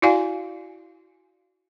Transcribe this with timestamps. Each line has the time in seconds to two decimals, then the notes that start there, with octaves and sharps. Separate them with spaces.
0.02 E4 F#4 D5 F5 G#5